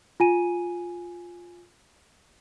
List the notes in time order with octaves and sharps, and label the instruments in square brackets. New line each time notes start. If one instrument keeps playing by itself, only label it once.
[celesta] F4 G#5 D#7